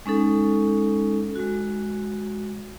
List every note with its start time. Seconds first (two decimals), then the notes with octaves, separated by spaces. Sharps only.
0.06 G#3 C#4 D#4 A4
1.36 G#3 F#4